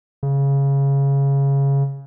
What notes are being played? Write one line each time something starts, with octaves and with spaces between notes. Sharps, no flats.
C#3